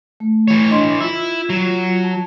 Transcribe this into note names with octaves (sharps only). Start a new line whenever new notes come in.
A3
E3 C#5
D4 D#5 C6
E4 F4 E6
F#3 F4
A5